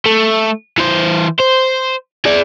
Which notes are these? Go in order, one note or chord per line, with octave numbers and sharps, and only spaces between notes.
A3
E3 C5
C5
G#4 D5